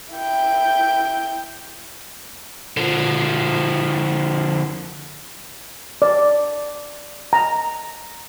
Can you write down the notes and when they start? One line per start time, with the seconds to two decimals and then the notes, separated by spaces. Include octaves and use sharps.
0.14 E4 G5
2.77 D3 F3
6.02 D5
7.33 A#5